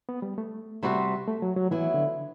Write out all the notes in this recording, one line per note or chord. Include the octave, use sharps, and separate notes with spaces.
B3
G3
A3
C3 G3 C4 F#4
A3
F#3
F#3
E3 F#3 B3 E4
D3